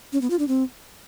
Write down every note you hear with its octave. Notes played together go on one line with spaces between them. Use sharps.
C#4
B3
F4
D4
C4